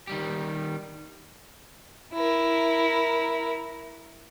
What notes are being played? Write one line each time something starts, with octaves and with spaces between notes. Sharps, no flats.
D#3 G3 G4
E4 A#4